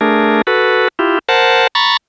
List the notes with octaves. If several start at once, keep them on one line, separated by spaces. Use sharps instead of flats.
A3 D4 G#4 A#4
F#4 A4 B4
E4 F4 G4
A#4 C5 F#5 A5
A#5 B5 C#6 A6